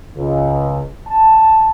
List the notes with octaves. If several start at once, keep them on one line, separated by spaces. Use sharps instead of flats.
C#2
A5